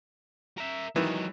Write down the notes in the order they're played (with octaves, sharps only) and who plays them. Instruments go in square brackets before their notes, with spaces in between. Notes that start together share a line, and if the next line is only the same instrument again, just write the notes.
[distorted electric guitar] A#4 E5
[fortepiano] D#3 E3 [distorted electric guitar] F#3 G#3